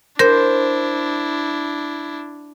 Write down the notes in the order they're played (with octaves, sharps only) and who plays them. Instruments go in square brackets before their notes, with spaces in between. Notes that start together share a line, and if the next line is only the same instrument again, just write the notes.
[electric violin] D4 E4 [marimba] A#4 [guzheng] C5